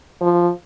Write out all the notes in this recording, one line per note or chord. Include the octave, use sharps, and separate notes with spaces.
F3